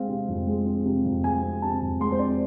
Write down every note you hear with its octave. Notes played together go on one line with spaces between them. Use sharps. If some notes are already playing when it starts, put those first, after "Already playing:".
Already playing: G#3 C4 F5
C3
F2
G#3
C4
C3
F2
G#3 G#5
C4
C3 A5
F2
G#3 C6
C5
C4 D5